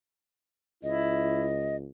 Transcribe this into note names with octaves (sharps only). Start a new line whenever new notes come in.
C#2 E4 D#5